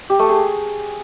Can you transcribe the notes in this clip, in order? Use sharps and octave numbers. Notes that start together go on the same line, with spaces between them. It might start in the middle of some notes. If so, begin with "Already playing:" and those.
G4
A3
G#4